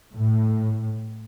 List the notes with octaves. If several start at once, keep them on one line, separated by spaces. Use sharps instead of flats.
A2